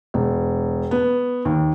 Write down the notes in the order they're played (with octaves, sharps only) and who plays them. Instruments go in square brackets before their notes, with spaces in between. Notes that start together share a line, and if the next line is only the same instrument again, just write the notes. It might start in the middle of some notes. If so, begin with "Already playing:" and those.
[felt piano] E1
B3
D#2